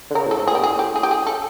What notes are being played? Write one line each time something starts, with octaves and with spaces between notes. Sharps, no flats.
D3
C#3 A#4
A2
A4
G#2
A2 G#4
A#2
G4
A2 G#4
G4
G#4
G4
G#4
A4